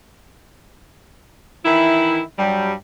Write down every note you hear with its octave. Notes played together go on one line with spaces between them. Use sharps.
D#3 E3 E4
G2 F#3 G3